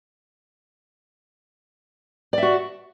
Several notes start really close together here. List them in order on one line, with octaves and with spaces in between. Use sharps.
D5 E5 F#4